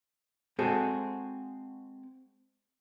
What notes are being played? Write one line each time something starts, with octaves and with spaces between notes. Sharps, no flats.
G#3 C4 F#4 G#4 A4